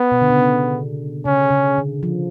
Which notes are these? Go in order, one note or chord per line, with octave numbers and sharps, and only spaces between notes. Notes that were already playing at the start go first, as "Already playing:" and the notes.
Already playing: B3
B2
D3
C#3
C#3 C#4
C#3
D3
F3